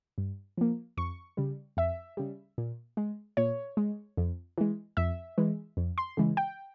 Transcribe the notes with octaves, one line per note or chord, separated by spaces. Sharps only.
G2
F3 A#3
F2 C#6
C#3 G3
F2 E5
C#3 G3
A#2
G#3
A#2 C#5
G#3
F2
E3 G#3
F2 E5
E3 G#3
F2
C6
C#3 E3 G#3
G5